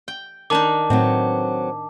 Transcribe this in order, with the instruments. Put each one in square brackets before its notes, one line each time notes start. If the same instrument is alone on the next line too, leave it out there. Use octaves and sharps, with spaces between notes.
[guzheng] G5
[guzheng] D#3 D4 D#4 [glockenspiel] A5 D6
[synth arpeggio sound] A2 [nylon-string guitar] F#3 B3 C4